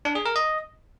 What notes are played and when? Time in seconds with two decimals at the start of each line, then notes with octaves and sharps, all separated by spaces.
0.05 D4
0.15 G#4
0.25 A#4
0.36 D#5